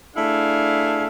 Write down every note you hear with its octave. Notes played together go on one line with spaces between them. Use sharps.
A3 D4 E4 G#4 F5